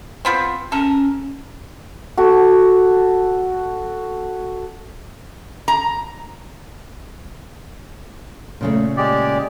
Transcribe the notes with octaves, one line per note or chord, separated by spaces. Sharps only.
F3 B3 C4
C#4 A4 A#4
F#4 A4
A#5
A#2 C#3 A3
G#3 G4 D5